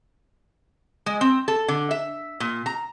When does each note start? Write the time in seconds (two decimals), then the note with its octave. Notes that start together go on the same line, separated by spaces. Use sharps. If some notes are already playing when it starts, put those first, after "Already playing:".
1.06 G#3
1.21 C4
1.48 A4
1.68 D3
1.91 E5
2.40 A#2
2.66 A#5